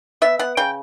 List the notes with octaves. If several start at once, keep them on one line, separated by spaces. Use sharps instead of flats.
B3 E5
B3 F#5
C#3 G5